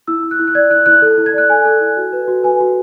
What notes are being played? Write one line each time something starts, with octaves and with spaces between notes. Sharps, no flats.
E4 E6
E4
F#6
E4
F#6
D5 G#6
E4 F#6
E4 F#6
A4
E4
G#6
D5 F#6
A4 G#5
A4
E4
F#4
B4
F#4
B4 G#5
F#4